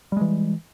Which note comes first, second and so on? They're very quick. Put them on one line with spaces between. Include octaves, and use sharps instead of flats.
G3 G#3 E3